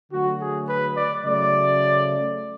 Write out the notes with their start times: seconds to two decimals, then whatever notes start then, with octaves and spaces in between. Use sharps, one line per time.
0.11 D3 F#3 A3 F#4
0.39 G#4
0.68 B4
0.96 D5
1.24 C#3 F#3 A3 D5